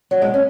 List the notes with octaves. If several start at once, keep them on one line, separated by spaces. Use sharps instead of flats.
F#3
B2 G#3
C#4